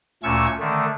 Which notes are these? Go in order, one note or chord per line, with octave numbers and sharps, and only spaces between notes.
D2 A#2 A3 C#4 C#6 E6
D3 D#3 A3